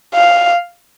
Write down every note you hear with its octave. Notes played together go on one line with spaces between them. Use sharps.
F5